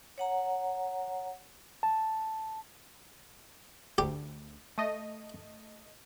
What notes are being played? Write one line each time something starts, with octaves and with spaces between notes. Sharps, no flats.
C#5 F#5 A#5
A5
D2 G4
A3 D#5